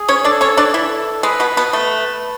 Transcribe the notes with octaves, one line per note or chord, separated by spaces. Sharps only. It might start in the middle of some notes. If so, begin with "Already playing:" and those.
Already playing: G#4
C#4 C#5
D4 A4 D5
C#4 C#5
D4 D5
E3 E4 A4
G#3 B4
B2 B3
B2 B3
A3 B4